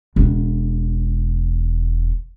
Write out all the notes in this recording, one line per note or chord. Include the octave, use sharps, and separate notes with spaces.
E1 C#4